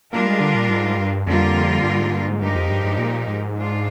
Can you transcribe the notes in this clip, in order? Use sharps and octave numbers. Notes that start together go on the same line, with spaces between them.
G3 A#3 D4 F4 A#4
G#3
D3
A#2
G#2
G2
F2 D3 G3 A#3 F4 A#4
G2
G#2
G2
G#2
G2 F3 G#3 D#4 G4 A#4
F2
G2
G2
A#2
G#2
G#3 D4 F4